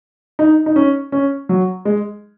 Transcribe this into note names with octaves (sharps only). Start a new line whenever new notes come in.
D#4
D#4
C#4
C#4
F#3
G#3